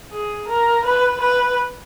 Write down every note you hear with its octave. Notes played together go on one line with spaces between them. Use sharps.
G#4
A#4
B4
B4